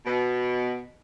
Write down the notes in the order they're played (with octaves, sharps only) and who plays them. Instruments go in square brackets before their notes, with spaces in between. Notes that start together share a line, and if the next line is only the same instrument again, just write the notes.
[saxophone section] B2